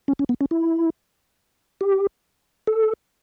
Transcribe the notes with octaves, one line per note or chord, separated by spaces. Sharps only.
C#4
C#4
B3
C#4
E4
G4
A4